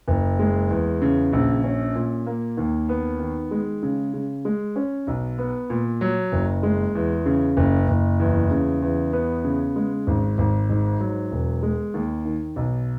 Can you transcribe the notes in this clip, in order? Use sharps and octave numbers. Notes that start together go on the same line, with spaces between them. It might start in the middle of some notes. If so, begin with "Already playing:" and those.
F#1
G#3
E2
C#3
A#1
C#4
A#2
A#3
D#2
B3
D#3
G#3
C#3
C#3
G#3
C#4
B1
B3
A#2
F#3
F#1
G#3
E2
C#3
F#1
F#1
E2
C#3
E2
B3
C#3
G#3
G#1
G#1
G#2
F#3
E1
G#3
D#2
D#3
B1